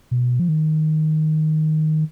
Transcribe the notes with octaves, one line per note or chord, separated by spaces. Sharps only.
B2
F3
D#3